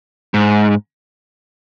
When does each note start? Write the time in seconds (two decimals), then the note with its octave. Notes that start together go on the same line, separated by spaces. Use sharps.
0.34 G#2